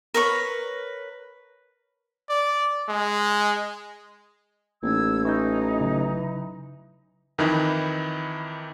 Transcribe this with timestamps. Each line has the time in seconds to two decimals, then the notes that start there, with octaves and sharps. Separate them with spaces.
0.14 A#4 B4 C#5
2.29 D5
2.89 G#3
4.83 A1 A#3 D#4 E6 G#6
5.25 E3 D#4 C#6 G6
5.81 C#3 F#3
7.38 F2 D#3 E3 D#4 E4